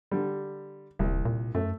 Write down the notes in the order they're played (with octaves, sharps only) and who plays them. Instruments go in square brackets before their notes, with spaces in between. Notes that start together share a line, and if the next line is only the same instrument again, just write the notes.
[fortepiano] D3 G3
[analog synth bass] D#1 [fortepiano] C2
[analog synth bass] A#2
[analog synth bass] F#2 [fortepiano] A3